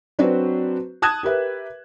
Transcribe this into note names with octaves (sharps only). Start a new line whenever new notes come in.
F#3 C4 D4 F#4 B4 C5
A5 D#6 F#6 G#6 E7
G4 A#4 B4 E5